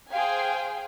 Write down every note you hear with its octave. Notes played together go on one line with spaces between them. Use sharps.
G#4 C5 F5 G5 G#5